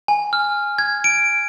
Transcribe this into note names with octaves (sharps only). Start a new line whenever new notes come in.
G#5
F6
G#6
D7